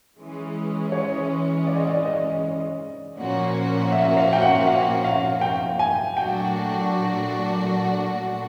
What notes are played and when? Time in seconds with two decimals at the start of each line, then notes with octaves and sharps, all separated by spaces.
0.18 E3 G#3 C#4
0.92 C#5
1.67 D5
1.77 D#5
1.86 D5
2.05 D#5
3.17 A#2 F3 A#3 C#4 F#4
3.92 E5
4.17 F5
4.33 G5
4.42 F#5
4.67 F5
5.04 F5
5.41 G5
5.79 G#5
6.17 A#2 F#3 A3 D4 F#4 G5